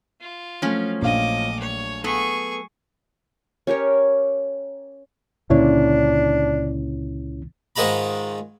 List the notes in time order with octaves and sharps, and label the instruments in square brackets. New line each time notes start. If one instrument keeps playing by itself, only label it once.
[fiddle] F4
[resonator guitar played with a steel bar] F3 C#4 [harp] F#3 A3
[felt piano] A#1 F5 [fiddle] D#5 D6
[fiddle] C#5
[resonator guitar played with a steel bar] B3 A4 [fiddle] G#4 C#6
[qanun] C#4 G4 A#4 C#5
[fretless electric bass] C#2 A#2 D3 [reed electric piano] C#4 E4 C#5 [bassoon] D4
[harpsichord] G#2 D#3 G#3 F4 A#5 B5